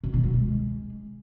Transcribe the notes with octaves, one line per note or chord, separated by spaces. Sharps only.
B2
D#3
F#3
G#3